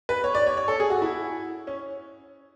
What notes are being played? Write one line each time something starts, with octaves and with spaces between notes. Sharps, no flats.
B4
C#5
D5
C#5
C#5
A4
G#4
F#4
E4
C#4